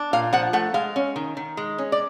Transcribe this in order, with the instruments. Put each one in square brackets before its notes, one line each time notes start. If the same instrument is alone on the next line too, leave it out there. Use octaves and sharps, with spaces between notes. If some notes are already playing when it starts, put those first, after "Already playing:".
Already playing: [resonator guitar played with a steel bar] D4
A#2 F5
F3 F#5
A3 F#5
G#3 F5
C#4
D#3
D#3
G#3
C#4
D5